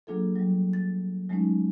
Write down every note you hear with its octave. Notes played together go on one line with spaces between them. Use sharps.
F#3 A#3 D4 F4 G#4 A4
F#3 G3
A6
F#3 G#3 A3 C#4 D#4